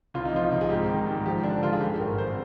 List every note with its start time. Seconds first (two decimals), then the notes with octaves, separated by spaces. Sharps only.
0.14 C2 F4
0.25 D#4
0.33 F3 F4
0.52 C2
0.61 G#4
0.70 G#2 G4
0.89 D#3
1.07 G#2
1.26 F3 G4
1.43 D3 D4
1.63 D3 F4
1.73 G#4
1.81 G2 G4
1.99 G#1 A#4
2.18 G#1 C5